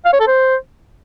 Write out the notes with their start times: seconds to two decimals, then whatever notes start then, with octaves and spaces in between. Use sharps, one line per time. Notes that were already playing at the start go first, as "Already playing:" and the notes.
0.05 F5
0.13 C#5
0.20 A4
0.27 C5